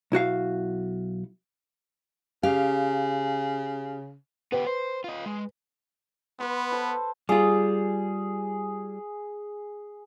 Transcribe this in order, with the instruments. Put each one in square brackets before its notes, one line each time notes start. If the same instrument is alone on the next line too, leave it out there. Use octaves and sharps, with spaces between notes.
[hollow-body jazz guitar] B1 E4 F#4 F5
[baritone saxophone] C#3 [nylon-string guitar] G4 F5
[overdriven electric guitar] B3 G4 [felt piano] B4
[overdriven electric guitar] C5
F4 D#5
G#3
[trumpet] B3 [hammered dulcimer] B4 C6
[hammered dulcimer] A4 C5 A5
[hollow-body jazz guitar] G3 F4 [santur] G#4